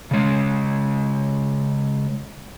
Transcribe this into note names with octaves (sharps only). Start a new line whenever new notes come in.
C#3 G#3